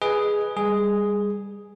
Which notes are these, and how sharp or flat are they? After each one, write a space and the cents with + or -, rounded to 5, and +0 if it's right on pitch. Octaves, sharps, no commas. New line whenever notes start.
G#4 +0 B4 +0 D#5 +0
G3 +30 G#4 +0